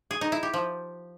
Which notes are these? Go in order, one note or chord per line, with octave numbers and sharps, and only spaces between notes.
G#4
D#4
E4
G4
F3